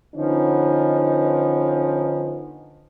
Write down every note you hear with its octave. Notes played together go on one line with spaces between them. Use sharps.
D3 F3 B3 C#4 D#4